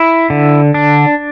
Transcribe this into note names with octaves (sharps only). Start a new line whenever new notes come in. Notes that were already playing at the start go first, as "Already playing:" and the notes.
Already playing: E4
D3
D4